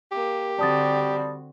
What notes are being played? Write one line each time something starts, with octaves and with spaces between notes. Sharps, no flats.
A#3 G4
D3 G3 C4 F#4 A5 D#6 A6